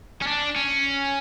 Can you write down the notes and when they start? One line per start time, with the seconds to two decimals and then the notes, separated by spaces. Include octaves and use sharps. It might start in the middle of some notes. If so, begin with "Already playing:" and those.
0.22 C#4
0.27 D4
0.56 C#4